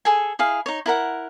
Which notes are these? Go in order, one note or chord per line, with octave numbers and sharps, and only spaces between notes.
G#4 A4 G#5
E4 G#4 F5
D#4 C#5
E4 A#4 F#5